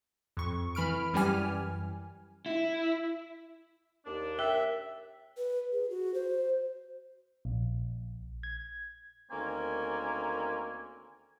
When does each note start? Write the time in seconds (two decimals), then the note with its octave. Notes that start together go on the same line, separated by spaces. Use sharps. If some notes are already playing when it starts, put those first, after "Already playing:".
0.37 F2 C#6
0.75 E3 B5 F6 D7
1.13 F#2 E3 G3 G4 G#5 F6
2.46 E4
4.06 D#2 D4
4.39 A#4 E5 G5
5.37 B4
5.72 G#4
5.90 F#4
6.14 C5
7.45 A#1
8.43 G#6
9.31 D2 D#3 A#3 C4 C#4 G#5